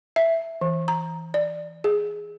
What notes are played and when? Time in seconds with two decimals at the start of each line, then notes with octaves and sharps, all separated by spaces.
0.16 E5
0.61 E3
0.88 A#5
1.34 D5
1.84 G#4